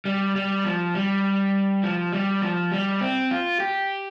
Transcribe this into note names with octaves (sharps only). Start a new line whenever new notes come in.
G3
G3
F3
G3
F3
G3
F3
G3
C4
F4
G4